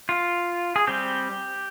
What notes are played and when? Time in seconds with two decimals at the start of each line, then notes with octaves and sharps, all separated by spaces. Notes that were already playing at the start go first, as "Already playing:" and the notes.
0.09 F4
0.76 G#4
0.87 G3 C4 G4